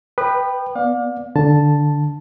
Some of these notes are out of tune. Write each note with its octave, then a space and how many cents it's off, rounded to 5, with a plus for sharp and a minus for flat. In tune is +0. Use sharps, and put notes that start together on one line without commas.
B4 +0 G5 +0 D#6 -40
B3 -5 D5 +0 F5 +40
D3 +0 A5 +0